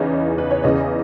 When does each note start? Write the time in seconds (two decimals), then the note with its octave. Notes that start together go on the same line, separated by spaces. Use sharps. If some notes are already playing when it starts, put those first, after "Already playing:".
Already playing: E2 C#3 E3 B3 D#4 C#5
0.38 B4
0.51 C#5
0.63 E2 C#3 E3 D#5